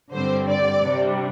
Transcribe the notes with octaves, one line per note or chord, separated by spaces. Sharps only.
G2 D3 G3 C4 C5
D5
C3 G3 D4